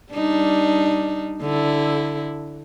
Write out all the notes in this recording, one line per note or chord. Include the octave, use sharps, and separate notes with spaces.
G3 D4 D#4
D3 E4